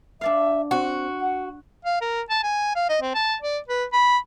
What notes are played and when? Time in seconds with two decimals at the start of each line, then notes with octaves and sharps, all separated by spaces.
0.21 D4 D5 E5 F5
0.71 C4 F#4
1.21 F#5
1.85 F5
2.01 A#4
2.30 A5
2.43 G#5
2.76 F5
2.89 D#5
3.01 C4
3.15 A5
3.42 D5
3.68 B4
3.93 B5